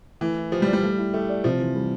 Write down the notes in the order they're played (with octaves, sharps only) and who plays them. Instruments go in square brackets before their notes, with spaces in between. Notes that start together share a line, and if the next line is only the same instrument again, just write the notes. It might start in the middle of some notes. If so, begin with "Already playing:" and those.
[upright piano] E3 [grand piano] A3
[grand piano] E4
[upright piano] F3 [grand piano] G4
[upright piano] G3
[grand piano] D5
[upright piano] G3
[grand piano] A3
E4
[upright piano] A3 [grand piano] G4
[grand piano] D5
[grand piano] C3 [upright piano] F3
[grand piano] E3
G3